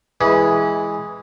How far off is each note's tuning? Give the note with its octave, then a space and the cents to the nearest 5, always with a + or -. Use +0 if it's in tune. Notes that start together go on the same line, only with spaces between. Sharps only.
E3 +0 G#3 +0 B5 -35